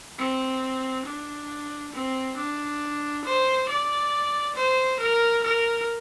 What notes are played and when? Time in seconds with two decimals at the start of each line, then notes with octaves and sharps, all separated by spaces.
0.18 C4
1.05 D4
1.93 C4
2.37 D4
3.25 C5
3.69 D5
4.56 C5
5.00 A#4
5.44 A#4